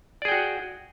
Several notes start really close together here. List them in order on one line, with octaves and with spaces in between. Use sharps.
D5 G#4 G5 F#4